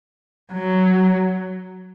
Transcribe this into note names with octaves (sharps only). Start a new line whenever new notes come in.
F#3